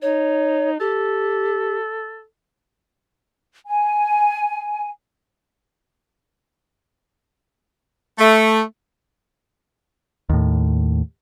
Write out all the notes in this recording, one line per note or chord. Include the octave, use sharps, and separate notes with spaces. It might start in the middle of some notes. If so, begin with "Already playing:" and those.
D#4 C#5
G4 A4
G#5
A3
D#2 A2